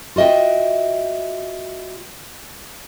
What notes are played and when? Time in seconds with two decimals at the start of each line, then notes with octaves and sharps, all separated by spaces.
0.16 F4 F#4 D#5 E5 G5